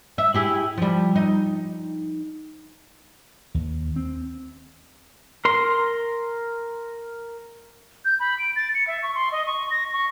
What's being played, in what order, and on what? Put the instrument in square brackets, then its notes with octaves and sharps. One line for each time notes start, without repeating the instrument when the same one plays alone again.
[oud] E5
E4 G4 G#4
F3 G3
D#4
[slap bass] D#2
C4
[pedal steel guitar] A#4 C6
[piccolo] G6
B5
D7
A6
C#7
E5
C#6
C6
D#5
C#6
A#6
C#6